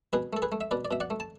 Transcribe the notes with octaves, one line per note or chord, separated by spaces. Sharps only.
B2 G#4 B4
A3 A4
G#4 B4
A3
E5
B2 B4 D5
D5
B2 E5
D5 F#5
A3
A5